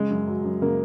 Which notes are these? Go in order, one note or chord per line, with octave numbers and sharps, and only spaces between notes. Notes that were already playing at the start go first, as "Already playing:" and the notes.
Already playing: C#3 G#3
F#2
F#3
F#2
C#3 A#3